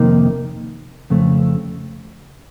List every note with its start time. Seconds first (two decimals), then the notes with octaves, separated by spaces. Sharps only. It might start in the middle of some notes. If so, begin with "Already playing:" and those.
Already playing: F2 C3 D#3 A#3 D#4
1.10 F2 C#3 A3